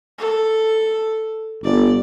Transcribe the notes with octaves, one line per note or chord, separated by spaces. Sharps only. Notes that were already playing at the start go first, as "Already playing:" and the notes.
A4
G1 D5